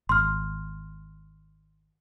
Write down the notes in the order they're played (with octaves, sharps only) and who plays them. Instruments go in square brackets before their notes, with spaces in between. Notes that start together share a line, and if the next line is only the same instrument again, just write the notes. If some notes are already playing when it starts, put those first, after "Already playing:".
[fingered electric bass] G#1 [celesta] C6 F6